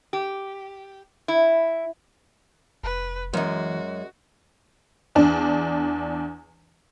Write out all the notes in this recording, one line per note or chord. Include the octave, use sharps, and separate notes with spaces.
G4
E4
F1 B4
F#2 E3 G#3 F#4
E2 D4